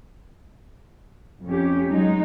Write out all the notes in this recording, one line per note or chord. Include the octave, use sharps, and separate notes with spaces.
F2 C#4 G4
F#3 G#3 D#4